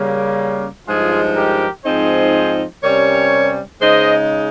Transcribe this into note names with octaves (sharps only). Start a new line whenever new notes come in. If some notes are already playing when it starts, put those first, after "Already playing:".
Already playing: C#3 G3 A#3
G2 F3 G#3 D#4 F4 G#4
G4 A#4
G#2 F3 C4 D#4 G#4 C5
C3 G3 C#4 A#4 C#5
C#3 G#3 D#4 C5 D#5